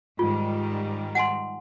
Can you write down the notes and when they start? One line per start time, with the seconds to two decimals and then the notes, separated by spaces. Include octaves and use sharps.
0.19 G#2 D#3 G3 F4
1.15 F#5 G#5 C6